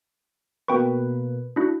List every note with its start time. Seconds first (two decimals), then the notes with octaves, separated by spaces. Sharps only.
0.68 B2 A#3 B4 G5 C#6
1.56 D4 E4 F#4